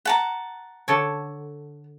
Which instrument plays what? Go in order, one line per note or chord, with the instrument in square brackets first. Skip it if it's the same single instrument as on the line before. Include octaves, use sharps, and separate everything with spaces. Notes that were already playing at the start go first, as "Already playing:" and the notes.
[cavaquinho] F#5 A5 A#5
[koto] D3 A4 C#5